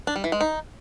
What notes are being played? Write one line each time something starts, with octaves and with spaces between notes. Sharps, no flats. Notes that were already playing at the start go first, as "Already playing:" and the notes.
D4
G3
E3
G#3
D#4